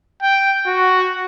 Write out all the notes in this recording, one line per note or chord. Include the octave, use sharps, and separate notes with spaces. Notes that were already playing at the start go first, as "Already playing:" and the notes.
G5
F#4